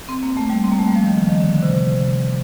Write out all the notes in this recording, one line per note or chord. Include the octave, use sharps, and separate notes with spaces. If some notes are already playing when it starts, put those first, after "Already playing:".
C4
A#3
A3
G3
C4
A#3
A3
G3
F3
D#3
F3
D#3
D3
D3
C3
C3